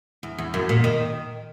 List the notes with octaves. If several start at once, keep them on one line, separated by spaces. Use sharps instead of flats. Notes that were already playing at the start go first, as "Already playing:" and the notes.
E2
E2
F#2
A#2
D#3